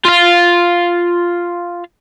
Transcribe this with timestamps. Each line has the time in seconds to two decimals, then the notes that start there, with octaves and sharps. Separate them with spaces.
0.05 F4 F5